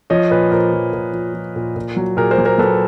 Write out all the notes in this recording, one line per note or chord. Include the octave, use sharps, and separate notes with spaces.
F3 C#5 D#5
A#2 B4 C#5
A#2 A#4 C5
F3
A#2
F3
F3
A#2
A#2
F#3
A#2 G#4 A#4
A#4 C5
F#3
A#4 C5
F#3 A4 B4